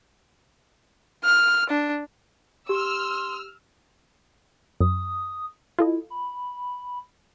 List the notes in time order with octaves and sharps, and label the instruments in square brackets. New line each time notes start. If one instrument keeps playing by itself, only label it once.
[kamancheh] F6
D4
[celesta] G4 [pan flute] C6 [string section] E6 F6
[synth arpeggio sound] F#2 [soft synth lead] D#6
[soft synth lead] E4 [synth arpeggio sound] F4 A4 D#5
[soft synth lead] B5